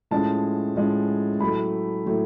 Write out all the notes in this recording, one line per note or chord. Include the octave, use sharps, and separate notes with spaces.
A2 F3 G#3 C#4 A5
A2 F3 G#3 C#4
A2 F#3 A3 B5
A2 F#3 A3